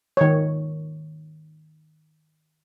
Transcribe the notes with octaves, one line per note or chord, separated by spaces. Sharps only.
D#3 C#5